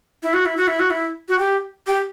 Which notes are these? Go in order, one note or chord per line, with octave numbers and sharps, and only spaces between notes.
E4
F#4
E4
F#4
E4
F#4
E4
F#4
G4
G4